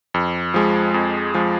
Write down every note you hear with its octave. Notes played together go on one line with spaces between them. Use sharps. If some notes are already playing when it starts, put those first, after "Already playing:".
F2
F3 G#3
F2
F3 G#3